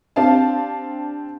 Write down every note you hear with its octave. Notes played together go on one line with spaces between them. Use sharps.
C4 D4 G4 F5 A5